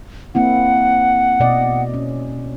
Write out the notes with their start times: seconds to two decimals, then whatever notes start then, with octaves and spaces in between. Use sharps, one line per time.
0.35 A#3 C4 E4 F#5
1.40 B2 D5 D#5
1.94 C#4